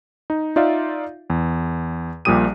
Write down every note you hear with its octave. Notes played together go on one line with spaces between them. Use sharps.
D#4
D#4 F4 D5 E5 F5
E2
A#1 A#2 G3 G4 D#6 D#7